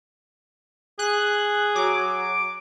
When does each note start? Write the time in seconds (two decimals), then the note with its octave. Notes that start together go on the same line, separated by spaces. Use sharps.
0.99 G#4 F#6
1.75 F#3 D6